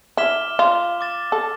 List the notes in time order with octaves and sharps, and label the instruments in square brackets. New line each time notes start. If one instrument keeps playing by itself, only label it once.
[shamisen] E4 [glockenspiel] D6 F6 B6 E7 G7
[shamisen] F4
[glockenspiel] D6 A6 E7
[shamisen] A4